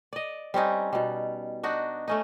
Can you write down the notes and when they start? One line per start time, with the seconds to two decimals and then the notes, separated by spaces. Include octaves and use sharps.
0.13 D5 D#5
0.54 G3 C4 C#4 D#4
0.93 B2 G3
1.64 D4 D#4 F#4
2.08 A3 C#4 D#4